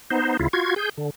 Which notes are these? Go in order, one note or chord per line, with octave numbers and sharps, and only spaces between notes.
B3 D#4 C5
D2 C#3 E4 F4
F4 F#4 G#6
G#4 G6
D3